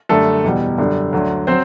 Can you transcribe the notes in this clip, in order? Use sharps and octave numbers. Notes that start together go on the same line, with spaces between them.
F#2 D3 G3 A3 A4
E2 B2 G3
F#2 D3 G3
D2 D3 F#3
F#3 C4 C5